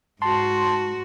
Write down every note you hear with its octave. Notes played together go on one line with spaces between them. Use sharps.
G#2 F#4 A5 C6